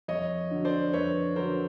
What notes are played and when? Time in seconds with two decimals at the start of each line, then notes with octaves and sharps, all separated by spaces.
0.08 F2 C#5 D#5
0.51 D3 F#3
0.65 C5 D5
0.93 F2 B4 C#5
1.36 D3 F#3 A#4 C5